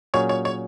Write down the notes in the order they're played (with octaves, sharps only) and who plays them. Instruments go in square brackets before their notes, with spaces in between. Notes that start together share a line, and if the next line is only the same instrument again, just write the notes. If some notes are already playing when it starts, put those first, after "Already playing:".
[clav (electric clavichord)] A#2 F#3 C#4 G#4 [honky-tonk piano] C#5
[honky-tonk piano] C#5
C#5